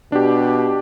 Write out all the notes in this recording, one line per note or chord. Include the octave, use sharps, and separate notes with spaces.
B2 D4 G4